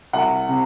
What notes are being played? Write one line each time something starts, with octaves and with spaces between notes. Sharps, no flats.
C2 F#5
C3